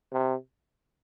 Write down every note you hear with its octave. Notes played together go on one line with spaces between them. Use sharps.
C3